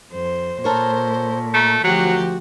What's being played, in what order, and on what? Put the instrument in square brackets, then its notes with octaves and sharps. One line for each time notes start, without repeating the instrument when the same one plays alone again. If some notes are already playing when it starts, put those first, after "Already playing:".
[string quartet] F2 C5
[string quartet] A#2 [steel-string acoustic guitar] A4 A#4 C#5 [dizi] C5
[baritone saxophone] A3 [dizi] A#5
[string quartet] D2 F3 G4 [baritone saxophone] F#3 [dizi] F#4